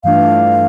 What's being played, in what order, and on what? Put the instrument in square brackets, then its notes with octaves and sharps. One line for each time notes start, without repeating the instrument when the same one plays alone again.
[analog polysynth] G2 E3 A3 D4 F4 [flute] F5